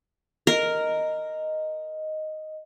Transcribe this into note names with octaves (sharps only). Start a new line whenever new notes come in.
A#4 D#5